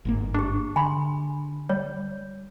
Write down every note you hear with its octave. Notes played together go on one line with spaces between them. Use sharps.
G1 G#2 A#3
D4 G4 G#4
D3 G#5 B5 C6
G3 C#5